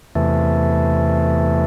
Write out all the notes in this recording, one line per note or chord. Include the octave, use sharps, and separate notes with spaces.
E2 C3 E3 A3